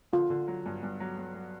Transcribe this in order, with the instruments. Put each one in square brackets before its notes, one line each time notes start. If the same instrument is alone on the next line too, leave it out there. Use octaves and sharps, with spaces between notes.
[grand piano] D3 [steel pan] F4
[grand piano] D3
F#3
G2
G2
F#3
F#3
F#3